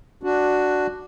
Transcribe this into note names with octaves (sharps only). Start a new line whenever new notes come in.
D4 F#4